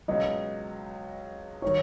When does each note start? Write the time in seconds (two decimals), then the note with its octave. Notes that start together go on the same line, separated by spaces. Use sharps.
0.08 C#2 B2 F#3 B3 D#5
1.62 D#3 F#3 C#5